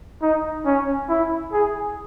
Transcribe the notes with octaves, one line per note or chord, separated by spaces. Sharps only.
D#4
C#4
E4
G#4